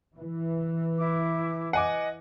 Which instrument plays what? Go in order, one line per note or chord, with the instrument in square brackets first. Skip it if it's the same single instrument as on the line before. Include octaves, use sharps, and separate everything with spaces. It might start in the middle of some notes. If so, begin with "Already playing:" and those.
[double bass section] E3
[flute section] E4 D6
[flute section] D#5 [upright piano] F#5 G#5 D6